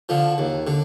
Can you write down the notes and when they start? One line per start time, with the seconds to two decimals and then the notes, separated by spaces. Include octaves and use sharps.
0.09 D3 F3
0.38 D#2
0.67 D3